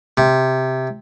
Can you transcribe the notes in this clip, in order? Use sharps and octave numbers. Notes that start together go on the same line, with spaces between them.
C3